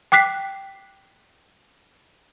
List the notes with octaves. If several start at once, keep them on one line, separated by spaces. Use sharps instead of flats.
G5 D6 F#6 B6 C7